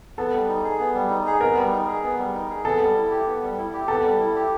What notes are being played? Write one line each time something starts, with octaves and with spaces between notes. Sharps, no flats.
B3 A4
G3
D#4
G#4
B3
G3
D#4
G#4
B3 A#4
G3
D#4
G#4
B3
G3
D#4
G#4
B3 A4
G3
E4
G4
B3
G3
E4
G4
B3 A4
G3
E4
G4